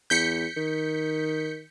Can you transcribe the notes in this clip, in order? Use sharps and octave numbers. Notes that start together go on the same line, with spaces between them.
E2 G6 B6 C#7
D#3